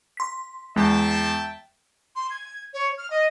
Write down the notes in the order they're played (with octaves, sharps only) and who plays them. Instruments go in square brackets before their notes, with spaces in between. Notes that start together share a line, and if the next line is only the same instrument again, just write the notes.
[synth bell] C6 B6
[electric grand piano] E2 [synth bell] G#3 [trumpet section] E5 G5 A5
[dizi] C6
G#6
C#5
F6
D#5